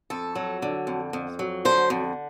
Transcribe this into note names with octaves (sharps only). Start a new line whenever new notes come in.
F2 A4
F#3
D3
F2
F2
F#3
D3 C5
F2